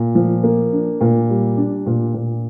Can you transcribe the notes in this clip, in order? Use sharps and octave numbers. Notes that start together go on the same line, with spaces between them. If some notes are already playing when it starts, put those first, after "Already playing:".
Already playing: A#2
F3
A#3
D4
A#2
G3
D4
A#2
A#2